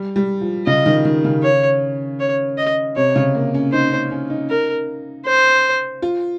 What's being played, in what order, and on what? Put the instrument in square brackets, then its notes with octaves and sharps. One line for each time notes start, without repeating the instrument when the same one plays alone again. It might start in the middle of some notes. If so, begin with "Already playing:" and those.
Already playing: [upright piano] G3
G3
F3
[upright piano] C#3 [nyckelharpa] D#5
[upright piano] D#3
D#3
C#3
[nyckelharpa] C#5
C#5
D#5
[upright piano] C3 [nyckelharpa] C#5
[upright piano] C#3
A#3
C#4
[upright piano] D#4 [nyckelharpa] C5
[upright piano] C#4
C#4
D#4
[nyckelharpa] A#4
C5
[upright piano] F4